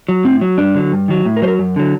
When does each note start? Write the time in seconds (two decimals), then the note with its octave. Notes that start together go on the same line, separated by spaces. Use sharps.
0.09 F#3
0.24 A2 C4
0.41 F#3
0.58 G2 D4
0.75 D3 F#3
0.93 G2
1.08 D#3 F#3
1.25 A2
1.37 A#4
1.42 F#3 C5
1.48 A#4
1.59 F#2
1.76 D3 F#3